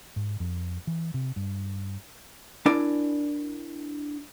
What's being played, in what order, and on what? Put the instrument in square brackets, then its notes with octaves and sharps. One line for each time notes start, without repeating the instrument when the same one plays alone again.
[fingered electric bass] G#2
F2
E3
C3
G2
[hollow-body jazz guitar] D4 E4 A#4 D5 G#5